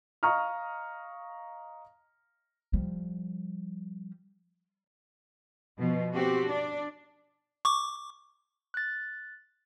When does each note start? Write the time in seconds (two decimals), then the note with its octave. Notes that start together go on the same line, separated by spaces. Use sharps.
0.23 D#5 F5 A#5 C#6 D#6 F6
2.73 F3 G3
5.78 B2 F3
6.13 C4 F#4 G4
6.47 D4 D5
7.65 C#6 D6
8.74 F#6 A6